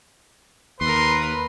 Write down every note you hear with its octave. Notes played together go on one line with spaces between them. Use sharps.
D#2 A#4 B4 C6 D#6